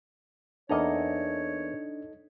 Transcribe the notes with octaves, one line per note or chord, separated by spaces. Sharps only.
E2 A#3 D4 D#4 A4 C#5 D#5 A#5